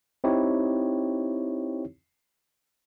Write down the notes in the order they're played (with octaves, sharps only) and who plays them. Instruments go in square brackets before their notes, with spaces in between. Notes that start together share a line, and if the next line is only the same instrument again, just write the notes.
[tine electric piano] C4 D#4 E4 G4 C#5